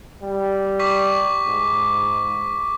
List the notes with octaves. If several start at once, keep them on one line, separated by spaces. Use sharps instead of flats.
G3
C#6 D6 B6
G#2